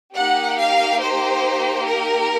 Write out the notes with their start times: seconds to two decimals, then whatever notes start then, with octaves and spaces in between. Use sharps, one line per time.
0.14 A#3 D#4 G4 F#5
0.57 F5
0.99 C5
1.85 A#4